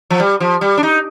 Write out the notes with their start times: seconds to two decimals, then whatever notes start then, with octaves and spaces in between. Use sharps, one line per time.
0.10 F3
0.20 G3
0.40 F3
0.61 G3
0.77 D4
0.83 D#4